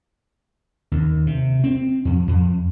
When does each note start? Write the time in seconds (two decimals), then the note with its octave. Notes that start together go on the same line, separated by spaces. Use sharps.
0.92 D#2
1.27 C3
1.64 C4
2.05 F2
2.28 F2